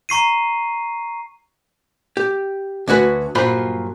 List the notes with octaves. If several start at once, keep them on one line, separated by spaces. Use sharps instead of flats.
A#5 C#6 C7 D#7
G4
D2 C#4 F#4 B4
G2 A#2 F#3 F4 C5 B5